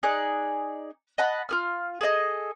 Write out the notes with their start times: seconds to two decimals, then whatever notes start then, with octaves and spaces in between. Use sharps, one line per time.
0.03 D#4 G#4 D5 F#6
1.18 D#5 F#5 A5 B5
1.49 F4 G#4 F6
2.01 G#4 A4 D5 D#5